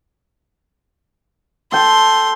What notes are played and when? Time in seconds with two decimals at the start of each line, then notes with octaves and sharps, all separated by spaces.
1.72 A4 G5 C6